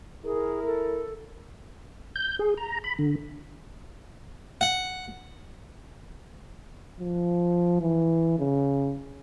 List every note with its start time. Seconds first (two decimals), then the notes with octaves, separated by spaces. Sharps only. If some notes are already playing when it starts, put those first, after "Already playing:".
0.25 E4 G#4 A#4
0.66 A4
2.16 G6
2.39 G#4
2.57 A#5
2.84 B5
2.99 D3
4.61 F#5
7.00 F3
7.81 E3
8.39 C#3